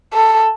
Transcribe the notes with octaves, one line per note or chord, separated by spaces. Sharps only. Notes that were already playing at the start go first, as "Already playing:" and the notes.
A4